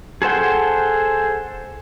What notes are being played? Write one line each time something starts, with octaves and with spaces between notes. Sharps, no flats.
G#4 A4 C5 F#5 G5